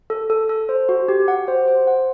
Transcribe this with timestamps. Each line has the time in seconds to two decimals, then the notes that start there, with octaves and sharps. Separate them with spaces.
0.10 A4
0.30 A4
0.49 A4
0.69 C5
0.89 F#4
1.08 G4
1.28 F#5
1.48 C5
1.68 C5
1.87 F#5